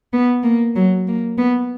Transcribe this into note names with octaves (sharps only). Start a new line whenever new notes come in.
B3
A#3
F#3
A#3
B3